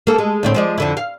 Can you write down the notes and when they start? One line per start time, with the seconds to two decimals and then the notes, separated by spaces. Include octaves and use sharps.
0.07 A#3 A4
0.18 G#3
0.43 D2 A2 C4
0.54 F3 G#3 D5
0.78 F2 D3 E4
0.97 F5